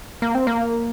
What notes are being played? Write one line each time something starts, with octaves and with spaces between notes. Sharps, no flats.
A#3
C4
A#3